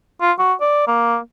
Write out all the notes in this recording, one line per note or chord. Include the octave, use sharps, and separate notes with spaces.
F4
F#4
D5
A#3